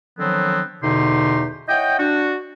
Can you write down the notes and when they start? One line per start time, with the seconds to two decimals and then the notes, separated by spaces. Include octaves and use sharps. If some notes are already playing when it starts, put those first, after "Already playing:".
0.18 D3 D#3 F3 F#3 B3 C4
0.83 E2 B2 D3 D#4 G4 C6
1.69 E4 C#5 D#5 F#5 G5
1.99 D4 F#4